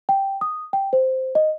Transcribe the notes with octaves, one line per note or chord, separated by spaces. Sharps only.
G5
D#6
G5
C5
D#5